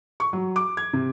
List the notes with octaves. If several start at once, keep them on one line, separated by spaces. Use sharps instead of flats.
C#6
F#3
D6
G#6
C3